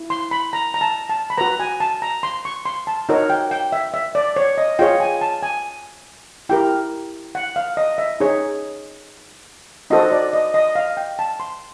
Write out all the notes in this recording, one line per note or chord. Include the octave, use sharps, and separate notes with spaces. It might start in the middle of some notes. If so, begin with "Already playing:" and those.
Already playing: E4
C6
B5
A#5
A#5
A5
A5
B5
F#4 B4 A#5
G#5
A5
A#5
C6
C#6
C6
A5
D#4 F#4 A#4 C#5
G5
G5
E5
E5
D5
C#5
D#5
F4 G#4 C#5 G5
G#5
A5
G#5
E4 G4 A#4 G5
F#5
F5
D#5
E5
D#4 G#4 C#5
D#4 F#4 A4 C5 D#5
D5
D#5
D#5
F5
G5
A5
C6